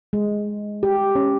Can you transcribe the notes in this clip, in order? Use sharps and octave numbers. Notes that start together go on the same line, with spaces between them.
G#3
G4
C#4